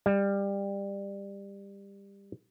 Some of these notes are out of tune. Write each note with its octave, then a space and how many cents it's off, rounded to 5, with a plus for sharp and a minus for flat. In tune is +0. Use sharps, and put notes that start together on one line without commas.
G3 +20